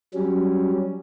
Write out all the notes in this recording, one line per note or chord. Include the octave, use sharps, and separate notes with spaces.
F#3 G3 C#4